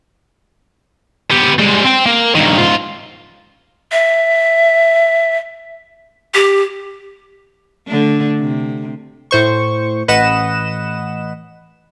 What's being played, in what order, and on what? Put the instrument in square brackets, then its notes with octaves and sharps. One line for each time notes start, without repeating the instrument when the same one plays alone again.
[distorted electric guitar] B3 G4
G3 G#3
C4 G5
A#3
G2 D#3
G#2 F4
[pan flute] E5
G4
[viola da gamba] D3 A3 D4
C3
[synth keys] A2 C5 C#6
A1 B4 D#5 F#5 E7